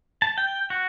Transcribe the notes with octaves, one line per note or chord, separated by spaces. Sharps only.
A5
G5
F#4